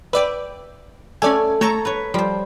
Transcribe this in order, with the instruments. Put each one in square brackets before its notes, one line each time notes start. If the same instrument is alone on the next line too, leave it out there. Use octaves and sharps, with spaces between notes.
[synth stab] B4 D5 [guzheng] E5 G5
[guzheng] A3 C#5 [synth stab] C#4 D5 G#5
[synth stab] A3 A4 A#5 [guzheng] C#5 A5
[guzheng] B4 C#5
[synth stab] F3 [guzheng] G3 C5